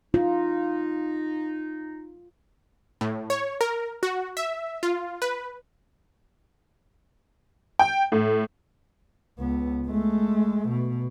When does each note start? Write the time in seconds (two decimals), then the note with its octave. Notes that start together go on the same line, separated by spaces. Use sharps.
0.14 D#4 F4
3.01 A2
3.30 C#5
3.61 A#4
4.03 F#4
4.37 E5
4.83 F4
5.22 B4
7.79 G5
8.12 A2
9.39 C#2 B3
9.87 G#3 A3
10.69 B2